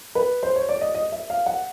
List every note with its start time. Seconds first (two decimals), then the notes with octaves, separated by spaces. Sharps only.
0.15 B4
0.43 C5
0.56 C#5
0.69 D5
0.81 D#5
0.95 D#5
1.12 E5
1.30 F5
1.46 F#5